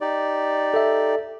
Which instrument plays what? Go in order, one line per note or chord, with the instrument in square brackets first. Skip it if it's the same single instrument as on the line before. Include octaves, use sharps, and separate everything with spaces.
[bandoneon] D#4 G4 D5
[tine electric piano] A4 E5